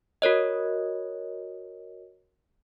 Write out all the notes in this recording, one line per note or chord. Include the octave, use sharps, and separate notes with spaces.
F#4 A#4 C#5 D#5